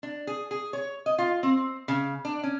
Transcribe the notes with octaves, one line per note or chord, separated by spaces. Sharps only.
D4
G#4
G#4
C#5
D#5
F4
C4
C#3
D4
C#4